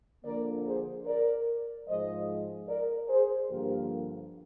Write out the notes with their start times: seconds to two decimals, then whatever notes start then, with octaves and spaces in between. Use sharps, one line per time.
0.24 D3 F3 A#3 A#4 D5
0.65 G#4 C5
1.05 A#4 D5
1.87 G#2 F3 G#3 C5 D#5
2.68 A#4 D5
3.08 G#4 C5
3.49 G2 D3 F3 A#3 G4 A#4